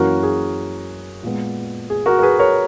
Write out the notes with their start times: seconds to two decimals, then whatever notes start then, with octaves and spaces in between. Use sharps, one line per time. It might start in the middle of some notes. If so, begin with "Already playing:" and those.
Already playing: F#2 E3 A#3 C#4 F#4 A#4
0.23 G#4
1.23 A#2 G#3 B3
1.90 G#4
2.06 F#4 A#4
2.19 A#4
2.22 G#4 B4
2.39 A#4 C#5